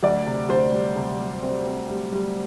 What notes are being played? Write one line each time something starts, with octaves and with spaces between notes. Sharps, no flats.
D2 D5
C3
D2 C5
G3
C3
G3
C4
C4
G3
G3